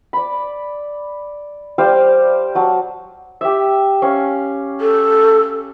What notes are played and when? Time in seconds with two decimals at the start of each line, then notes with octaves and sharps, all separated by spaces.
0.13 D5 B5
1.78 G3 C5 F5 G5
2.55 F#3 A5
3.41 G4 E5
4.02 C#4 F5
4.81 A4